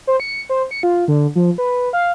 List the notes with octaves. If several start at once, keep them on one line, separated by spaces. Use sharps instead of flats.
C5
C#7
C5
C#7
F4
D3
F3
B4
F5